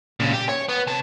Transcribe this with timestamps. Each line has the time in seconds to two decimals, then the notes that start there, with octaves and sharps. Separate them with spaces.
0.20 A#2 C#3
0.33 G4
0.49 C#5
0.69 B3
0.88 C3 A5